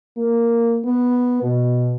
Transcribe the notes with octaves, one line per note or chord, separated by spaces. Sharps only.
A#3
B3
B2